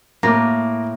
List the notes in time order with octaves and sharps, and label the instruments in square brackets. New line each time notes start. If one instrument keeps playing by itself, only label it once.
[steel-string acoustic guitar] A2 [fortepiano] A#3 [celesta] D6 A#6